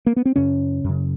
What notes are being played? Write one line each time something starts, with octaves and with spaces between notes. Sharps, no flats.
A#3
B3
C4
F#2 C#3 C#4
F#2 C#3